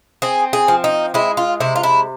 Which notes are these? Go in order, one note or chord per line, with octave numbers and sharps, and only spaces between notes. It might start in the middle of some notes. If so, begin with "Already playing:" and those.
C4 G#4
G#4
F3
D#4
G#3 E4
F4
C3 E4
F4
E4